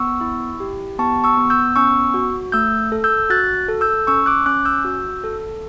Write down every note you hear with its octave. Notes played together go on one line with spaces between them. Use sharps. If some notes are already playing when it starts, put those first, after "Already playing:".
Already playing: B3 C#6 E6
E4
G4
B3 A5 C#6
C#6 E6
B3
E6 G6
C#4 C#6 E6
F#4
A3 E6 G6
A4
E6 G6
F#4 F#6 A6
A4
E6 G6
C#4 C#6 E6
D6 F#6
C#4 D6 F#6
E6 G6
F#4
A4